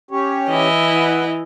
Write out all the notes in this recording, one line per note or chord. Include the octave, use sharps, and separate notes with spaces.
C#4 G4 C#5
E3 E4 D#5
B4 F#5